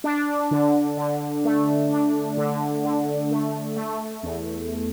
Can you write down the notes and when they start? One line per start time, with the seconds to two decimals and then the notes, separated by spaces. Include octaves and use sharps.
0.04 D4
0.51 D3
0.97 D3
1.45 A3
1.91 D4
2.37 D3
2.84 D3
3.31 A3
3.76 A3
4.23 E2